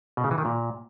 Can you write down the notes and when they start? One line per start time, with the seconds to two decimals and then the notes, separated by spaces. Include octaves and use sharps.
0.17 B2
0.24 C#3
0.31 E3
0.38 D#3
0.45 A#2